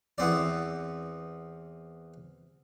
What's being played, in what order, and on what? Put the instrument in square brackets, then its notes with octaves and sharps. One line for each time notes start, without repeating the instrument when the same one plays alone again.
[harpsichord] E2 B3 C4 D5